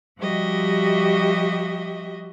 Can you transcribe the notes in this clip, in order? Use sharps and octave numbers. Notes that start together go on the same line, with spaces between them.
F3 G3 F#4 G4 D#5 E5